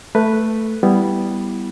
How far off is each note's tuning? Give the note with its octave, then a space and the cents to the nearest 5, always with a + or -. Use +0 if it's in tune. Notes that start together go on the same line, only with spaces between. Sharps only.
A3 +5 B4 +0
G3 +0 B3 +5 E4 +0